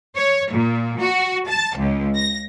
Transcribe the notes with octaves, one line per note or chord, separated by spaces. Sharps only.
C#5
A#2
F#4
A5
C#2
A#6